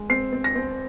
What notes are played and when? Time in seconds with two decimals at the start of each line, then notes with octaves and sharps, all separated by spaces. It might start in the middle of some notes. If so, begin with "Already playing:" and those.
Already playing: G#3
0.10 C4 C7
0.33 C4
0.44 A#6
0.56 C4